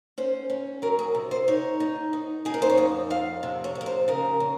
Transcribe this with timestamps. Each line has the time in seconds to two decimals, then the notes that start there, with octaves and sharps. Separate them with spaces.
0.18 C#4 C5
0.50 C#4
0.82 F#3 A#4
0.99 G#4
1.15 C3
1.31 C5
1.48 D#4 C#5
1.80 D#4
2.13 D#4
2.45 D#4 G#4
2.54 A#4
2.62 C5
2.70 C#5
2.77 F2 D#5
3.10 F2 F5
3.43 C3
3.64 C#5
3.75 F2
3.81 A#4
3.86 C5
4.08 C#3 A#4
4.40 C#3